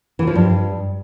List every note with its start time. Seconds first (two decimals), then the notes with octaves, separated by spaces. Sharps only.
0.19 E3
0.27 F3
0.35 G2